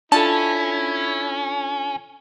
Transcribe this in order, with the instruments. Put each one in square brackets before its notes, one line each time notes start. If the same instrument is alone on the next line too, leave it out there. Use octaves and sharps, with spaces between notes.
[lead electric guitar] C#4 [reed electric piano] D4 F4 A4 [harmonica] E4 [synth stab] A5